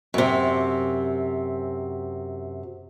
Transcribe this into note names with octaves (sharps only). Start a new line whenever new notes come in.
F#2 C3